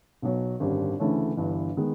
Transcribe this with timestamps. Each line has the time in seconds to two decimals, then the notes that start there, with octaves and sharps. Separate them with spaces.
0.22 B1 B2 F#3
0.60 G#1 F#2 D3 G3
0.99 D2 C#3 E3 A3 C#4
1.37 G1 G2 E3
1.77 D#3 G#3 B3